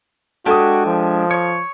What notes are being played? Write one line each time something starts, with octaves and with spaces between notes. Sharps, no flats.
G#3 D4 F#4 G4 A4 D#6
F3
C#5 C#6